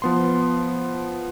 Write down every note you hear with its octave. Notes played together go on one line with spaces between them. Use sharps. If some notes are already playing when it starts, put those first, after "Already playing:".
F3 B3 C6